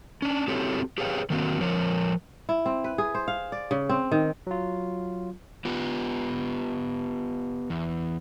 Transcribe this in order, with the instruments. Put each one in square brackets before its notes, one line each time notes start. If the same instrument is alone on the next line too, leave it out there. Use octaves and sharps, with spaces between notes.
[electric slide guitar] C#4 D4
C4 E4 F#4 G4 A4 C#5
G4 G#4 B4 C#5 F5 G5
D#3 F#3 A#3 C4 F#4
F3 A#4 C#5
[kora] E4
C4
B4
G#4
C5
F5
D5
C#3
C4
D#3
[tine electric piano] F#3 F4
[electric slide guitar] B3 F4 G4
E2